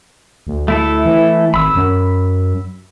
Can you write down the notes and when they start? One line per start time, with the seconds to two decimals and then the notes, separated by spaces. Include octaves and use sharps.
0.47 D2
0.68 A3 E4 A4
1.05 E3
1.54 G#1 B5 E6
1.75 F#2